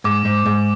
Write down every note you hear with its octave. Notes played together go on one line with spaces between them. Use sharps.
G#2 D6
G#2
G#2